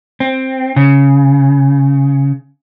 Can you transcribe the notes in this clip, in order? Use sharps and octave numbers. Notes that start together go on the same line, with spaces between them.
C4
C#3